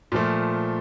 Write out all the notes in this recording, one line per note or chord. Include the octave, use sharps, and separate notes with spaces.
A#2 F3 A3